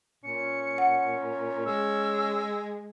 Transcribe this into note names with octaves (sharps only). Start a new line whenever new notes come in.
A#2 C#4 C#7
F#5
G#3 E6